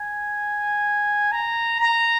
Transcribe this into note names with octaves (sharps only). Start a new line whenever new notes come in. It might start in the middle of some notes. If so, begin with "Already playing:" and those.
Already playing: G#5
A#5
A#5